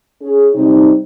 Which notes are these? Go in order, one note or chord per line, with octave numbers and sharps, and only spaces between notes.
C#4 G#4
C3 G3 C4 D#4